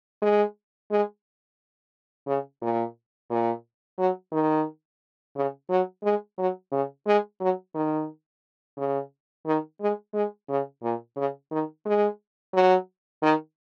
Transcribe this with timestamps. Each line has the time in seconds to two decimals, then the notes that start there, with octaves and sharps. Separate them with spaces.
0.22 G#3
0.91 G#3
2.27 C#3
2.62 A#2
3.30 A#2
3.99 F#3
4.32 D#3
5.36 C#3
5.70 F#3
6.04 G#3
6.38 F#3
6.72 C#3
7.07 G#3
7.41 F#3
7.75 D#3
8.78 C#3
9.46 D#3
9.81 G#3
10.14 G#3
10.49 C#3
10.83 A#2
11.17 C#3
11.51 D#3
11.86 G#3
12.54 F#3
13.22 D#3